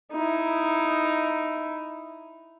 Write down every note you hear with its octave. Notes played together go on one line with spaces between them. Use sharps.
D#4 E4